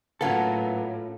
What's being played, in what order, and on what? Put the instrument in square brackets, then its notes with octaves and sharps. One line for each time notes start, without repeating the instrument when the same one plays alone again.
[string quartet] A2 [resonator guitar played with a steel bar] F#3 A#3 B3 [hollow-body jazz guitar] C#4 F4 A4